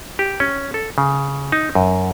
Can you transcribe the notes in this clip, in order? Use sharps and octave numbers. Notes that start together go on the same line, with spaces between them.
G4
C#4
A4
C#3
D#4
F#2